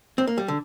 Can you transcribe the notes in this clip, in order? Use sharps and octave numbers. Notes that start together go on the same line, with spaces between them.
C4
A#3
G3
D3